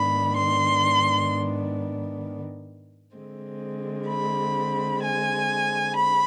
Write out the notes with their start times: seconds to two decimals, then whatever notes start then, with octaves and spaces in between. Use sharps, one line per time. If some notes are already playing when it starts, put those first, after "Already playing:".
Already playing: G#2 D#3 B3 D4 B5
0.35 C6
3.15 D3 G#3 C4
4.07 B5
5.01 G#5
5.95 B5